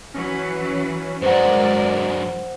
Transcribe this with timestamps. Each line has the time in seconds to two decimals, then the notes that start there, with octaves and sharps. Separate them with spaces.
0.14 E3 F#3 C#4 B4
1.22 G2 F#3 G#3 A#4 C5 D5 F#5